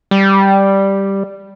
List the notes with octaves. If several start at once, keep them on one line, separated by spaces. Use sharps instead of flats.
G3